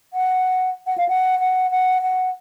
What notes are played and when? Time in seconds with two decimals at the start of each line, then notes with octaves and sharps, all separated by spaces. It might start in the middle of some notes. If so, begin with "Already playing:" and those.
0.13 F#5
0.87 F#5
0.98 F5
1.08 F#5
1.40 F#5
1.71 F#5
2.02 F#5